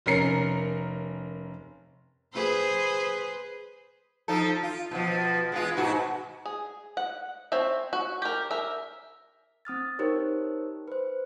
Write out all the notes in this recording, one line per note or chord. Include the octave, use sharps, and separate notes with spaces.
F1 C#4 A#4 C7 C#7
G#4 B4 C5
F3 D#4 A4
F4
B2 F3
G#3 B3 F4
G#2 B2 F#4
G#4
F#5
C4 C#5 E5
F#4
G4 A#4
A#4 E5
C4 D#6 F6 A6
D#4 G4 A#4 C5 C#5
B4 C5